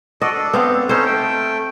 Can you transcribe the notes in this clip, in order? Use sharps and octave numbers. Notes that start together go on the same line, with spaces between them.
F#4 A4 D5 D#5
D4 A4
B3 C4 F5
C#4 D#4 A4 C5 C#5
A3 G5